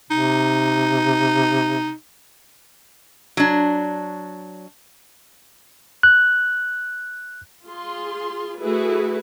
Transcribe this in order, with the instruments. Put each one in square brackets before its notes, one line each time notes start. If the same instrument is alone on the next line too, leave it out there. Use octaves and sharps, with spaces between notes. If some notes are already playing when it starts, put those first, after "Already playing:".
[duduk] C3 [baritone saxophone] D#4
[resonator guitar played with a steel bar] F#3 D4
[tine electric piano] F#6
[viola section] F4 G#4 C6
A3 E4 F#4 G#4 B4